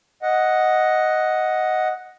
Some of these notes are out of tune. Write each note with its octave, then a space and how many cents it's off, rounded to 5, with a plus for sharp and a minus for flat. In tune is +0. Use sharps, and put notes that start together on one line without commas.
D#5 +5 F#5 +0